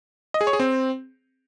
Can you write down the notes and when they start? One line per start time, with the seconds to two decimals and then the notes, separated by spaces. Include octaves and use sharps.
0.34 D#5
0.41 G#4
0.47 C#5
0.53 G#4
0.60 C4